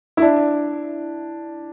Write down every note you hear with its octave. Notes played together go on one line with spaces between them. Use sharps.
E4
D4